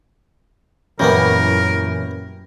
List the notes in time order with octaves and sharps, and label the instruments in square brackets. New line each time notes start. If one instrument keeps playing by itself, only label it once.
[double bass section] F#2 [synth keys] A#2 E3 C#4 [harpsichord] G3 A#3 B3 [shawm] A#4